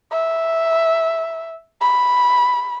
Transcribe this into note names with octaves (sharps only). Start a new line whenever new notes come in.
E5
B5